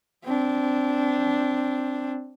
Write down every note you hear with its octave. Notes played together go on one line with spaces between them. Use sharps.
C4 D4